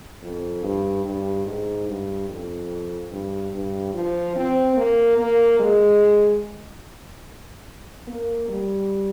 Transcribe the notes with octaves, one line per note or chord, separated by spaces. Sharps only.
F2
G2
G2
G#2
G2
F2
G2
G2
F3
C4
A#3
A#3
G#3
A#3
G3